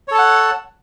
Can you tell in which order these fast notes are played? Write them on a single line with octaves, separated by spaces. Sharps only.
C#5 A4 A5 F#5